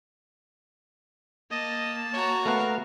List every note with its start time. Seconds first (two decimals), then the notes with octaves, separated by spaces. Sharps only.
1.51 A#3 D#5 A5
2.13 F#4 C#5 A#5
2.46 A3 B3 A#4 F5 F#5